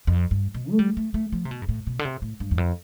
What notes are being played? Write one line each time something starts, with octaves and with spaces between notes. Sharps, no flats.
F2
G2
B2
A3
G3
A3
A3
F3
C3
B2
G2
A2
B2
D3
C3
A2
G2
E2
F2